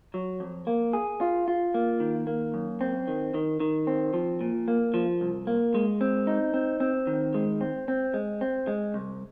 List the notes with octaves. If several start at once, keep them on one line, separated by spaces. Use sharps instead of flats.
F#3
F2
A#3
G#4
F4
F4
A#3
D#3
A#3
F#2
C4
D#3
D#3
D#3
C4
F3
A#2
A#3
F3
C2
A#3
G#3
C4
D#4
C4
C4
D#3
G#3
C4
C4
G#3
C4
G#3
C2